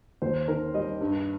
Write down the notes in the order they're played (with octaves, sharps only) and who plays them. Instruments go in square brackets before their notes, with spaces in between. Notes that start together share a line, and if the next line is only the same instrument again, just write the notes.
[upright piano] D#2 C5
D#3 A#4
G3 D#5
G2